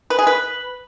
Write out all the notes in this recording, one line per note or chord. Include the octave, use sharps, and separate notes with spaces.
B4
G#4
B4